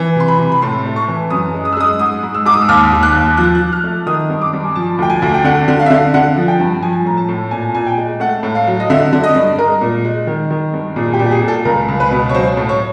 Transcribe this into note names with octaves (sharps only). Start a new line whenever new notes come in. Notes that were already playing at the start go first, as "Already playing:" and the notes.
Already playing: E3
C3 C6
B5
C3
B5
A2 C6
A3
C#6
E3
F#2 D#6
G#3
D#6
E6
G#3 D#6
G#2 D#6
G#2
E6
G#2 D6
D#6
E6
D#2 F6
D#2
F#6
D#2
F3 F#6
F#6
F3
F6
A3
D#3 D#6
G2
D6
G2
G#5
F3 A5
D2 G5
G#5
D2
G5
D3 F#5
D3
F5
E5
D3 F5
D3 F#5
F3
G5
G2
F3 G#5
A2 A#5
A5
A2
A#2 G#5
A#2 G#5
G5
G#3
A3 F#5
A2
F5
F#3
D#5
D3 E5
D3
D#5
G2
G#3 A#4
A#2
G#3
D#3
D#3
G2
A#2 G#4
G4
A#2
G4
G#4
A#2
A4
C#2 A#4
C#2
B4
B2
C#5
F#3 C5
A2
C#5